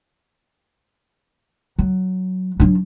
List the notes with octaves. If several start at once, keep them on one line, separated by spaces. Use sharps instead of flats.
F#3
F#3 D4